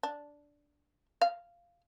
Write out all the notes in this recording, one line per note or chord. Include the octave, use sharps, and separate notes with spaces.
D4
F5